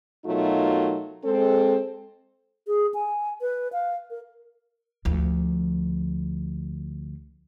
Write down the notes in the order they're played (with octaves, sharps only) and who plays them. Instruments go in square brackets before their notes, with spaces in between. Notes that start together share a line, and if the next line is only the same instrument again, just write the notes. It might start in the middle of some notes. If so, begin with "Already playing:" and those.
[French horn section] B2 F#3 A3 D#4 F4 A#4
G#3 C4 A4
[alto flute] G#4
G#5
B4
F5
A#4
[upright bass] D2 F3